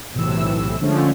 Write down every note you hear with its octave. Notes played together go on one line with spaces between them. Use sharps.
B1 A2 C3 E3 E6
D3 F3 G#3 A3 C#4